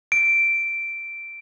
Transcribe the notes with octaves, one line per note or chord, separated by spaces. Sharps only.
D7